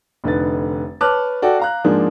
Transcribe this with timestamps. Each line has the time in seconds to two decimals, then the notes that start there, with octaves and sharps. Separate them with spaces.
0.24 F1 D3 D#4 B4 A6
1.01 B4 C#5 A5 D6 F6 F#6
1.42 F#4 A4 D5 G5
1.59 F5 A#5 F#6
1.85 G#2 F3 A#3 D4 G#4